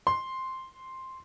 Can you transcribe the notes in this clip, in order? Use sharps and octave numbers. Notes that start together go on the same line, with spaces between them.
C6